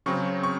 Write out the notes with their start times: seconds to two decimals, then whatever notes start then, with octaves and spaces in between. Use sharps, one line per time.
0.06 C#3 F#3 C4 C#6
0.43 C#6